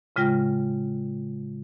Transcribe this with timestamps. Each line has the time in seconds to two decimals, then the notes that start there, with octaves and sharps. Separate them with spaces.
0.16 A2 C#3 G#3 F4 G5 A#6